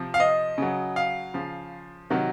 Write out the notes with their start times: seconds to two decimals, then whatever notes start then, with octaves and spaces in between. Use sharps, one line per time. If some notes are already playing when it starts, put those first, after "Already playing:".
Already playing: C3 F3
0.14 F5
0.20 D#5
0.58 C#3 F#3
0.96 F5
1.34 C#3 F3
2.10 C3 D#3 F#3